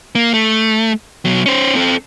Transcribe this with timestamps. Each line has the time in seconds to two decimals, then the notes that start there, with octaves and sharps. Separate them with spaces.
0.15 A#3
0.34 A3
1.25 B2 F#3
1.46 C#4 C5
1.75 C4 A4